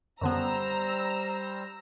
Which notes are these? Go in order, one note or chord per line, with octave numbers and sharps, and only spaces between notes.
F#2 D3 G3 B3 C5 A#5 E6